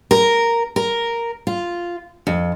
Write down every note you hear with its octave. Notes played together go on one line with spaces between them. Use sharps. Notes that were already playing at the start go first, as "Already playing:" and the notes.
A#4
A#4
F4
F2